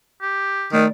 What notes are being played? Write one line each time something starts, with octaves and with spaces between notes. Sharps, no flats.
G4
D#3 A3 D5